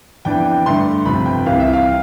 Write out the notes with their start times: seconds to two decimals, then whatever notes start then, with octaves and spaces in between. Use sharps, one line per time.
0.25 F2 E3 B3 D4 G5
0.45 G5
0.66 G2 D3 A3 C6
1.05 G1 F2 C3 F3 B5
1.26 G5
1.46 C2 C3 E3 F5
1.60 E5
1.73 F5